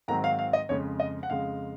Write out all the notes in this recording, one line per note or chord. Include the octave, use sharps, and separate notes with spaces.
G#2 D#3 F#3 C4 A#5
F5
F5
D#5
F2 C#3 G#3 C#5
D#5
F#5
F2 C#3 G#3 F5